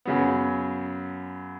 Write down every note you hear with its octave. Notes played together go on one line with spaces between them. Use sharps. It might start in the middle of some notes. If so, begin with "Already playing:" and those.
F#2 C#3 F#3 B3